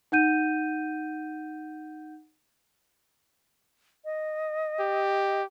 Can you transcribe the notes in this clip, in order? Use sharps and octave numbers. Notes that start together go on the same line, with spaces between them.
D#4 F#5 G6 D#7
D#5
G4